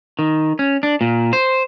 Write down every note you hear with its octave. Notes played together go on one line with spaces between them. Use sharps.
D#3
C#4
D4
A#2
C5